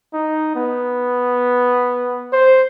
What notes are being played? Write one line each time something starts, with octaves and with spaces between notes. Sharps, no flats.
D#4
B3
C5